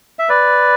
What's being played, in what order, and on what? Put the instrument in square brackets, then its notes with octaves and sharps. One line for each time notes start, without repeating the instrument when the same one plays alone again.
[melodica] E5
B4 D5